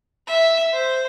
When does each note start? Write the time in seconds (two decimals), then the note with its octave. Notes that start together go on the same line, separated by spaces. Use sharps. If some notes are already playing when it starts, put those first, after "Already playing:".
0.27 E5
0.74 C5